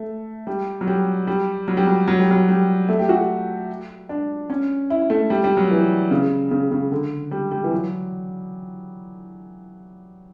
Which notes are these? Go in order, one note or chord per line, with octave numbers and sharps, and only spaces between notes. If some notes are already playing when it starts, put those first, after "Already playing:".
Already playing: A3
G3
F#3
G3
G3
F#3
G3
F#3
F#3
G3
F#3
G3
A3
G4
F#4
D4
C#4
E4
A3
G3
G3
F#3
E3
C#3
C#3
C#3
D3
G3
G3
E3
F#3